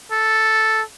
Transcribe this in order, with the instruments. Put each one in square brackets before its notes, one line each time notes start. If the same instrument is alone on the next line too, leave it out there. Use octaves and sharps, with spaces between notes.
[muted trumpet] A4